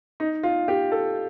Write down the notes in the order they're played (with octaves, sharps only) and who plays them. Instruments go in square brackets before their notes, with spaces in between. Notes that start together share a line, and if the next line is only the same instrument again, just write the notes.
[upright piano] D#4
F4
G4
A4